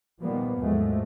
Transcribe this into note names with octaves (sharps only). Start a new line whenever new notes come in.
A#2 D#3 F3 G3 A#3 B3
D#2 G#2 F3 F#3 G#3 A3